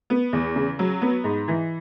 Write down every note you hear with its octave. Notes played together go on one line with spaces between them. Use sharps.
B3
E2
C#3
F#3
B3
G#2
E3